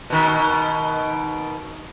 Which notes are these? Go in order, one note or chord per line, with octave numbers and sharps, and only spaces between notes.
B2 D#3